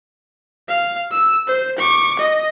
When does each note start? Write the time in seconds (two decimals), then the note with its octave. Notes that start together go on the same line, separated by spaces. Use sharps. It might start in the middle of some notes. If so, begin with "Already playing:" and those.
0.68 F5
1.11 E6
1.47 C5
1.78 C#6 D6
2.19 D#5